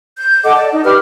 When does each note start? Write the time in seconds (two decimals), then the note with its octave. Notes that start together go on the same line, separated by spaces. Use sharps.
0.18 G6
0.44 A4 D#5 F#5 D6
0.56 D5 A5
0.72 D#4 D#5
0.84 G4 B4 D6 F6